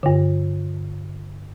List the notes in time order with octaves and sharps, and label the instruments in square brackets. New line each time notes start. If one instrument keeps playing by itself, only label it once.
[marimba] G2 D3